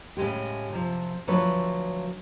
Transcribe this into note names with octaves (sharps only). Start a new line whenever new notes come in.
A2 C#3 G#3 G4
C3 F3
D2 F3 F#3 A3 B4 C#5